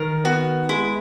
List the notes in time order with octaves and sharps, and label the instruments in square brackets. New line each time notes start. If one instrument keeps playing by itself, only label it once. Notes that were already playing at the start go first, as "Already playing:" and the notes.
Already playing: [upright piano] D#3 [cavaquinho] A#4
[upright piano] B3 [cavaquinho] F#4
[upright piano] G#3 [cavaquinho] E4